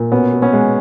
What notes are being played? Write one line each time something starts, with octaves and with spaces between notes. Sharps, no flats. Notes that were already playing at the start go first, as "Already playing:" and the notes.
Already playing: A#2
B2 B3 C#4
B2
B3 C#4
G#3